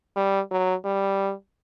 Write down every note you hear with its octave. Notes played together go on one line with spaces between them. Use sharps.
G3
F#3
G3